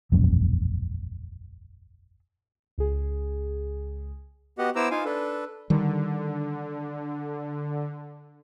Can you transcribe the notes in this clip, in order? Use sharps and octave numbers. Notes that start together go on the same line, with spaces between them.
E1 A#1 F#2
C#2 G#4
B3 F#4 G4 D#5 F#5
B3 E4 C5 A#5 D6 E6
D#4 F4 F5 G#5
D4 A4 B4
D3 D#3 G3